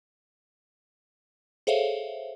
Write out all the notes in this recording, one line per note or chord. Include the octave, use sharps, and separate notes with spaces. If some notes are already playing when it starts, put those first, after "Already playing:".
G#4 A4 C5 C#5 E5 F5